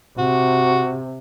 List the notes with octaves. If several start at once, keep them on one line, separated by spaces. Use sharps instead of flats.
C3 F#4